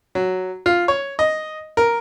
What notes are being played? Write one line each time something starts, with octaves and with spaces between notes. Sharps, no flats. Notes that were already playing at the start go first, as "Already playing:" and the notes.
F#3
F4
C#5
D#5
A#4